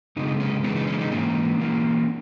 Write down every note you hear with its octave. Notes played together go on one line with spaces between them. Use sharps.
F#2 C#3 G#3 B3 D#4
C#4
F#2 C#3 E3 G#3 B3 C#4
D#4
C#4
D#4
G#2 E3 A#3 C#4
E3 A#3